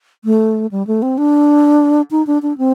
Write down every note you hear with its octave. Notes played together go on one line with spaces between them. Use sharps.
A3
G3
A3
C4
D4
D#4
D4
D4
C4